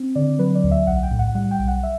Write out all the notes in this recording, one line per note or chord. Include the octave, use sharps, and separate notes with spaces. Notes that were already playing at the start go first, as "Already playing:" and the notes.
Already playing: C4
D3 D5
F#3 B4
D5
D2
E5
B1 F#5
G5
A2
F#5
G3 F#5
G5
B1
F#5
E5